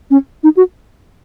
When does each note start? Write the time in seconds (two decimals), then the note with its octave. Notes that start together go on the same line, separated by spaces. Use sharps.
0.11 C#4
0.43 D#4
0.57 F#4